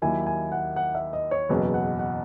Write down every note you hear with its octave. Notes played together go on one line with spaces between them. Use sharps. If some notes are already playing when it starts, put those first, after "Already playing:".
D#2 D#3 F#3 A#3 E4 G#5
G#5
F#5
F#5
E5
D#5
C#5
F#1 E2 B2 F#3 B4
F#5
F#5